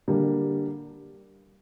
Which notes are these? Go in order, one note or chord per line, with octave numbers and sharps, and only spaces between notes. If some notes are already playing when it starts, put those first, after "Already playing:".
D3 G3 A#3